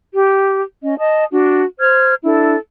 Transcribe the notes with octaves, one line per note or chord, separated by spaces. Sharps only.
G4
C#4 D#5
D#5 A5 D#6
D4 F#4
C5 F6 G#6
D4 E4 A4